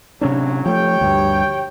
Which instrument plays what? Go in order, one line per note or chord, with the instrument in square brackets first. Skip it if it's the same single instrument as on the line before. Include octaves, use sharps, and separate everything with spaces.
[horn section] A2 F#3 [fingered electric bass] C3 C#4 D4
[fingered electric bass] F3 A3 [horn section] G4 C#5 G5
[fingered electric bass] D2 G2